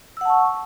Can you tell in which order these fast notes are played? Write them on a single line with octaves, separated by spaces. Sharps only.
E6 F#5 A5 C#6